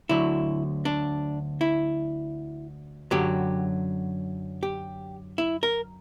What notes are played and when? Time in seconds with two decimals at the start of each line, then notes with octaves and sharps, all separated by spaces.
0.09 D2 D3 F#3 E4
0.85 D4
1.61 E4
3.11 F#2 D3 F#3 G4
4.63 G4
5.38 E4
5.63 A#4